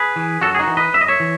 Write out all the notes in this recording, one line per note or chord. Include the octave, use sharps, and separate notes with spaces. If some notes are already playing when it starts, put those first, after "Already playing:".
Already playing: G#4 B4
E3
F#2 F#4 A4
G#4
D#4 F#4
E3
B4 D#5
F#2 E5
D#5
C#5 E5
E3